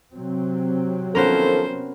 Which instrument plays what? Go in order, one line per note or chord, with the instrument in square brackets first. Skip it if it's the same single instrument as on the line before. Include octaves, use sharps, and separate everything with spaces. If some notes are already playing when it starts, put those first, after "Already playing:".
[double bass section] C3 F#3 C4
[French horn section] D#3 F3 A4 [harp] B3 C#4 A#4 [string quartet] C5